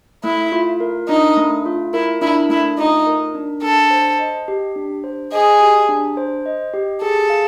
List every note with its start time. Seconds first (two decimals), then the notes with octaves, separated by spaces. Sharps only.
0.24 A3 E4
0.52 F4
0.80 A#4
1.09 D4 D#4
1.37 A3
1.66 F4
1.94 E4 A#4
2.22 D4 E4
2.49 A3 E4
2.78 D#4 F4
3.07 A#4
3.35 D4
3.62 D4 A4
3.91 C5
4.19 D#5
4.48 G4
4.76 D4
5.04 C5
5.32 G#4 D#5
5.60 G4
5.89 D4
6.17 C5
6.46 D#5
6.74 G4
7.02 G#4 A4
7.30 F5